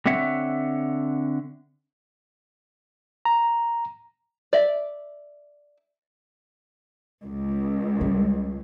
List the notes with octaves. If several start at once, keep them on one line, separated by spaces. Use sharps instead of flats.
D3 C4 C#5 E5 F#5
A#5
D5 E5
C#2
G3